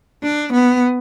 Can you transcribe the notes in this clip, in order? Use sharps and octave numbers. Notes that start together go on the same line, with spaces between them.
D4
B3